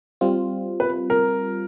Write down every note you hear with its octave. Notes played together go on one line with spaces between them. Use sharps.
G3 C4 F4
B4
A#4